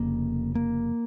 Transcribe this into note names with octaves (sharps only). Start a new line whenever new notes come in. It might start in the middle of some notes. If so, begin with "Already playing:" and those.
Already playing: F1 F2 C#3 A#3
A#3